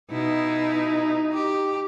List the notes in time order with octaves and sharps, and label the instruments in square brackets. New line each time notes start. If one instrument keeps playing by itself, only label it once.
[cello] B2 E4 [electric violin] D#4
[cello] G4